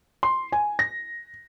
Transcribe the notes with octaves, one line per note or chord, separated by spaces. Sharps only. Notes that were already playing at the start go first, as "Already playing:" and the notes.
C6
G#5
A#6